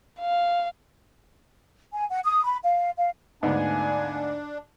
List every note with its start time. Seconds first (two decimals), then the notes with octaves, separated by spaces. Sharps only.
0.20 F5
1.93 G#5
2.09 F#5
2.24 D#6
2.44 B5
2.63 F5
2.97 F5
3.43 D2 G#2 A3 B3 D4 F5 G#5